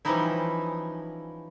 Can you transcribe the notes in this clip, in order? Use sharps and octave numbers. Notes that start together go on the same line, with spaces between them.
E3 F3 G3 C#4 D#4 E4